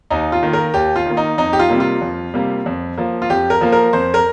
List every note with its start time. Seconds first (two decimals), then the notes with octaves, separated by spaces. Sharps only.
0.10 D#2 D#4
0.32 F4
0.43 D#3 A#3
0.53 A#4
0.74 D#2 G4
0.96 F4
1.06 D#3 A#3
1.17 D#4
1.38 F2 D#4
1.53 G4
1.59 F4
1.70 C3 G3 A#3
1.80 F4
2.01 F2
2.34 C3 G3 A#3
2.66 F2
2.98 F3 A#3
3.22 F4
3.30 F2 G4
3.50 A#4
3.61 F3 A#3
3.72 A#4
3.93 F2 C5
4.14 A#4